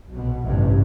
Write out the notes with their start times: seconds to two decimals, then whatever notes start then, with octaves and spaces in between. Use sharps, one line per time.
0.10 B1 B2
0.43 A1 D2 G2 C3